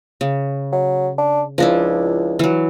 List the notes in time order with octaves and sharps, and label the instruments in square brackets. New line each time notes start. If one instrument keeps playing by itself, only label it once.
[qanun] C#3
[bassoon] F#3
D4
[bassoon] C#2 [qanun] F3 D4 E4
[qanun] E3 F#3